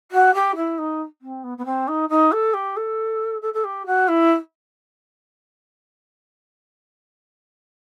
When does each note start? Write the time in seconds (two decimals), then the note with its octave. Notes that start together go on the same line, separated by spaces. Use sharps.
0.11 F#4
0.34 G4
0.56 E4
0.78 D#4
1.21 C4
1.43 B3
1.57 B3
1.65 C4
1.87 D#4
2.09 D#4
2.32 A4
2.53 G4
2.76 A4
3.41 A4
3.53 A4
3.64 G4
3.86 F#4
4.08 E4